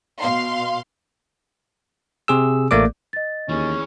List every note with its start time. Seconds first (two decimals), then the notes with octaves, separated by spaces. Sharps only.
0.20 B2 F5 C6
2.28 C3 G#4 E6
2.71 A1 A3 A#3 D5 D6
3.13 D#5 A6
3.49 D#2 E3 C#4 G#4